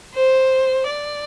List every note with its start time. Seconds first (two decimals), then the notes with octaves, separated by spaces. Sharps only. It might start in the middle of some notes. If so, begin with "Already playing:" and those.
0.15 C5
0.88 D5